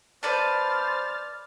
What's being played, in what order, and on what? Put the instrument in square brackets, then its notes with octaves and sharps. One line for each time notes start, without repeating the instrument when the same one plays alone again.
[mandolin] B4 D5 A5 [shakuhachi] C5 [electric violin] F6 A6